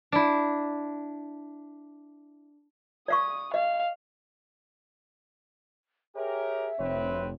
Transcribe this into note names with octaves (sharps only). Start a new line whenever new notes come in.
D4 E4
D5 F5 C#6 D#6
D#5 F5
G4 G#4 A#4 C#5 E5
F1 D2 C4 B4 C#5